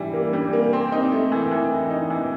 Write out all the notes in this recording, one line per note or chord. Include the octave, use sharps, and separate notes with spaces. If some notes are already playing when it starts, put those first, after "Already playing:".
Already playing: E3 G3
A#3
G3
A#3
C4
D#4
A3
E3
E3
E3
D#4
E3